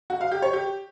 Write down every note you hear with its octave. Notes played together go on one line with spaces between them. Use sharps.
F#4
F5
G4
C#5
G4